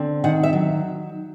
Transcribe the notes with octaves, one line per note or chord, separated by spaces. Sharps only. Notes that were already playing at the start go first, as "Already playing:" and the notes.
Already playing: D3 C4
D#3 F#5
E5
F#3